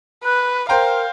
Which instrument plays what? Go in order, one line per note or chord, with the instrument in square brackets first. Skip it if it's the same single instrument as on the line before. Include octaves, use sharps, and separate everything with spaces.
[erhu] B4 [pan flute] F#6
[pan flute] A#4 [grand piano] C5 G5 A#5 [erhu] F5